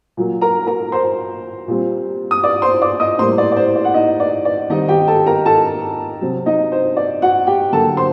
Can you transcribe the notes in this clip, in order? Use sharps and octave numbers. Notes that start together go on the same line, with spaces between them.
A#2 F#3 A#3
A#4 A#5
A#4 A#5
C5 C6
A#2 G3 C4
D#6
D5 D6
C5 C6
D5 D6
D#5 D#6
A2 G3 A#3 C5 C6
D5
D5
C5
D5
F#5
D#4 D#5
D5
D5
D#3 G3 C4 D#4 D#5
G4 G5
A4 A5
A#4 A#5
A4 A5
C3 F#3 C4
D#4 D#5
C5
D5
F#4 F#5
G4 G5
D3 F#3 A#3 A4 A5
C5 C6